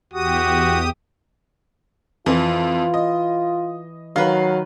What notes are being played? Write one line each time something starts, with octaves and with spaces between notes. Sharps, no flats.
E2 F#4 G4 D#6
F2 E3 F4
D#5
D#3 F#3 B4 F5